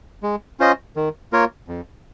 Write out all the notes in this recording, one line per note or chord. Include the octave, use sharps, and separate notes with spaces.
G#3
C#4 F4 C5 D#5
D#3
A#3 F4 A#4 C#5
F2